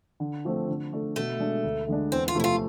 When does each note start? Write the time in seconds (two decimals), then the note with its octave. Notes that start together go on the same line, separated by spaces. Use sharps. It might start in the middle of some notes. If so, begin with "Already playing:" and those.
0.20 D3
0.45 F3 A3 C4
0.68 D3
0.93 A3 D4 A4
1.16 B2 A3
1.40 G#3 D4
1.64 D2
1.88 D3 G#3 D4
2.12 E2 C4
2.28 F4
2.35 C3 F3 A3 E4
2.44 F4